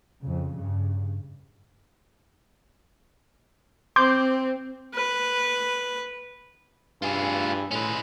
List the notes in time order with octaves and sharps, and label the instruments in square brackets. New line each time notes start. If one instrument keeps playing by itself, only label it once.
[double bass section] F2 C#3
G2 C#3
[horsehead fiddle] C4 [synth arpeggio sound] C6 D6 G6
[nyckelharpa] B4
[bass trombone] G2 [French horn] E3 [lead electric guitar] F4 G#4
[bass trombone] A2 [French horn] G#3 [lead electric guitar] C#4 B4